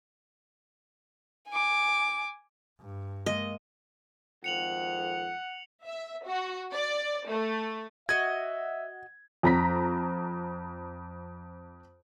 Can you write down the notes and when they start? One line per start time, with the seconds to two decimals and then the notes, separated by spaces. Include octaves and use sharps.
1.49 G#5 D6
2.80 G2
3.26 G#3 A#3 D#5
4.44 G#1 F2 F#5 C#7 F7 F#7
5.85 E5
6.26 F#4
6.74 D5
7.27 A3
8.09 F#4 D#5 E5 G#6
9.43 F2 A#5 B6